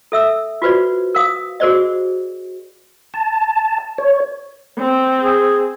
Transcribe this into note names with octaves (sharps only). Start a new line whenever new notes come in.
A4 E5 E6
F4 F#4 B4 C5 D5
A#4 F5 D#6
F#4 G#4 A#4 C5 D5 D#5
A5
C#5
C4
G#4